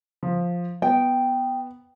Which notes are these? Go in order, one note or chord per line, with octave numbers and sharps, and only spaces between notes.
F3
B3 G5